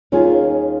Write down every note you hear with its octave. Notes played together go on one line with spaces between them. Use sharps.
D#2 D#3 C#4 F4 G#4